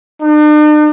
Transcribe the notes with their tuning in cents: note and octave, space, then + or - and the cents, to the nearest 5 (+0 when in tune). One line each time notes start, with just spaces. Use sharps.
D4 +45